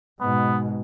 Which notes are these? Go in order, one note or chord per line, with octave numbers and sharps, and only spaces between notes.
G#2 B2 B3